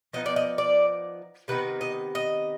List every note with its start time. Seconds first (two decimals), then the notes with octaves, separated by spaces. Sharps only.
0.13 F3 B3 D#4 D#5
0.26 D5
0.36 D#5
0.58 D5
1.48 C3 D#3 B3 D#4 B4
1.81 D#5
2.15 D#5